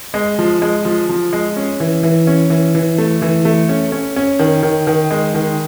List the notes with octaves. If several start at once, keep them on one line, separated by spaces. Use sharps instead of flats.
G#3
F3
G#3
F3
F3
G#3
C#4
E3
E3
C#4
E3
E3
A3
E3
A3
C#4
C#4
C#4
D#3
D#3
D#3
G#3
D#3